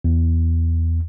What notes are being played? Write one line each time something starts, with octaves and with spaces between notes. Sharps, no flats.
E2